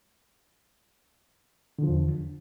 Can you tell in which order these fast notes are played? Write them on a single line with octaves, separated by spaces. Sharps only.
D3 F3 E2